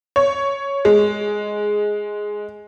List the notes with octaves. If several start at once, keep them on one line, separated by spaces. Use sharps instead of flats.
C#5
G#3